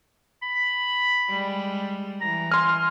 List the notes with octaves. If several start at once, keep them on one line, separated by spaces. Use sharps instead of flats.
B5
G3 G#3
E3 A#5
G#5 C6 F6